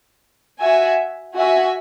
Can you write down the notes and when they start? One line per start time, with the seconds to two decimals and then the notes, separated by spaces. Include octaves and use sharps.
0.58 F#4 E5 G#5
1.35 F#4 E5 G#5